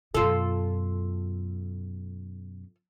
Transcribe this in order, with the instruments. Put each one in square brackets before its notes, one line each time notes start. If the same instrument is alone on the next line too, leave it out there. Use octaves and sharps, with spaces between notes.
[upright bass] F#2 B2 [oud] F4 A4